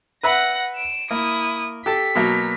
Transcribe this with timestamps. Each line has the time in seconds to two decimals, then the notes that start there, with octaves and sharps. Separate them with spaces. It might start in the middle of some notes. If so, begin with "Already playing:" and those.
0.23 B4 E5 F#5 B5 A#6
0.76 D7 E7
1.11 A#3 E4 D#6
1.86 G4 A4 A5 B6
2.15 B2 F#3 A#3